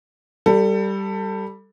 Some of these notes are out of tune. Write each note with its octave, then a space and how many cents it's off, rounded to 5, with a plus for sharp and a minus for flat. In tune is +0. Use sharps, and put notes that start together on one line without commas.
G3 +0 A4 +25